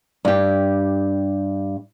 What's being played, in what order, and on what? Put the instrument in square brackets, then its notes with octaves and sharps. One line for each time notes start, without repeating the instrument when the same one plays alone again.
[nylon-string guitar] G2 G4